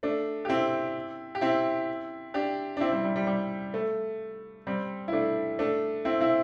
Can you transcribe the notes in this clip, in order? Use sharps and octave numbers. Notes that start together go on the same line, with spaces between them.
A3 D4
G4
C4 E4
G4
C4 E4
D4 G4
D4
C4 E4
G3 C4
G3
G3
G3
A3
G3 C4
E4
A3 D4
A3 D4
C4 E4
C4 E4